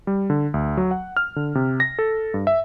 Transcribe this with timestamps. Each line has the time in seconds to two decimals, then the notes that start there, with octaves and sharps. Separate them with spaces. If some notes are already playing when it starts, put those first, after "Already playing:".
0.07 G3
0.30 D3
0.54 D2
0.77 F#3
0.91 F#5
1.17 F6
1.36 D3
1.55 C3
1.80 A#6
1.99 A4
2.34 G2
2.47 E5